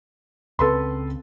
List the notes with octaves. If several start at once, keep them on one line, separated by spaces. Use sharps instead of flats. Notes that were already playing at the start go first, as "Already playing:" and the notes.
C#2 C#3 C4 A4 B4 C6